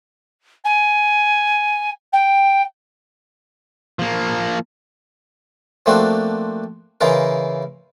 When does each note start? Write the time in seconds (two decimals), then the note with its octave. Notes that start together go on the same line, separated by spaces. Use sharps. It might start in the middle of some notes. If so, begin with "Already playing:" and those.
0.64 G#5
2.13 G5
3.99 F3 A#3
5.86 F3 A3 A#3 C4 D4 F#4
7.01 C#3 E3 D#4 F4 A#4